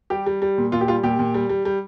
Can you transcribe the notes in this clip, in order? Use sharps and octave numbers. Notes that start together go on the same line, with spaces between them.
G3 G4
G3
G3
A#2
A#2 F4
G4
G3 F4
A#2 G4
A#2
G3
G3
G3